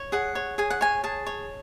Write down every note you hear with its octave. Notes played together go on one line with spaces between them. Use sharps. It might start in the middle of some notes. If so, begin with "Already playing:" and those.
Already playing: C#5
G#4 F#5
C#5
G#4 G#5
F#5
C#5 G#5
G#4 A5
C#5